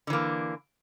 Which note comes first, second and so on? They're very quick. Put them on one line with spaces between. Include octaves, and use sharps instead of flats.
D3 E3 A#3